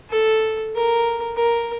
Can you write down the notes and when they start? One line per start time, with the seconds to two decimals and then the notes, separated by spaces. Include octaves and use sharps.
0.10 A4
0.75 A#4
1.35 A#4